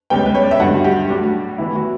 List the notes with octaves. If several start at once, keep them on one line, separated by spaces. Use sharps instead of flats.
C#2 C#3 G3 B3 G5
B4
C#5
D5
E5
G2 D3 F#3 F#5
F#4
G4
A2 G3 D4 F#4
A2 E3 B3 E4
F#4